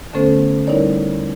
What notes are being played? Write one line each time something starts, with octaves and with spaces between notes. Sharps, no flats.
D3 A3 B3 C#4 A4 C5
G3 D#4 E4 A#4 C#5 D5